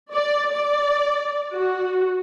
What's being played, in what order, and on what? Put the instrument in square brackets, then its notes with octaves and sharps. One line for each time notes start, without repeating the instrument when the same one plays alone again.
[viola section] D5
D5
F#4